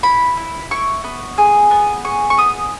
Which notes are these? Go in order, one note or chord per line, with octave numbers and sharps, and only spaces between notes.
E4 B5
E4
E4 C#6
B3
G#4
B3
G#4 C#6
C#6
B3 D#6